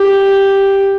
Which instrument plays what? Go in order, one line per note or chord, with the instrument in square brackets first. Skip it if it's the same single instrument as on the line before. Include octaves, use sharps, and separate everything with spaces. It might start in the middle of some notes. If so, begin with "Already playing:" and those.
Already playing: [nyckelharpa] G4